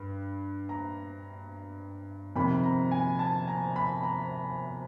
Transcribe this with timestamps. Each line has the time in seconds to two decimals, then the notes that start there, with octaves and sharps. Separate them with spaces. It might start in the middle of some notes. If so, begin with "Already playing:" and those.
Already playing: G2
0.69 A#5
2.36 F2 C3 D#3 B5
2.64 A#5
2.91 G#5
3.19 A5
3.48 A#5
3.76 B5
4.03 A#5